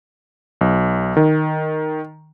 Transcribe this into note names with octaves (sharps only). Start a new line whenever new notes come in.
B1
D#3